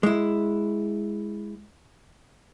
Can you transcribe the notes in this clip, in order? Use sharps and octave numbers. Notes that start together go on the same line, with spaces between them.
G#3 E4